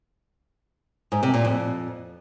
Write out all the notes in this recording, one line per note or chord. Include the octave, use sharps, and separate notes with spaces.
G#2
C3
A#2
F2